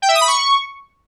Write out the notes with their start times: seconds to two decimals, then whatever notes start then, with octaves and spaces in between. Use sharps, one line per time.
0.02 G5
0.08 E5
0.15 D#6
0.21 B5
0.28 C#6